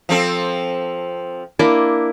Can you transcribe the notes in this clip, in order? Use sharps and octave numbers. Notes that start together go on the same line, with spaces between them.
F3 C4 A4
A#3 D4 E4